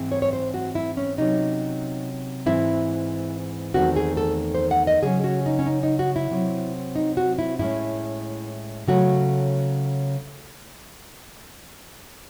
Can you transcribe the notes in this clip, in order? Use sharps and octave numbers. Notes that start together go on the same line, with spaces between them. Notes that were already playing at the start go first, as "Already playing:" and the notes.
Already playing: G#2 E3 C4
C#5
C#5
C5
F#4
E4
C#4
C3 F#3 C#4 D#4
G#2 E3 C4 E4
E2 D#3 A3 C4 F#4
G#4
A4
C5
F#5
D#5
C#3 F#3 C#4 G#4
F#4
D#4
C#4
D#4
D#4
F#4
E4
C3 F#3 C4
D#4
F#4
E4
A2 G#3 C#4 E4
C#3 F#3 A3 F#4